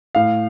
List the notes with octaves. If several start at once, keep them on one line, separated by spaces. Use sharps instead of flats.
A2 F5